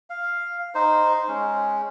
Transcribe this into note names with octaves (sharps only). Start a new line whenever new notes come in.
F5
D#4 C5
G#3 C#4